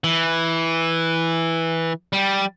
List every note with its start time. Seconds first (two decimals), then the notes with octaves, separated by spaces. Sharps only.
0.04 E3
2.13 G3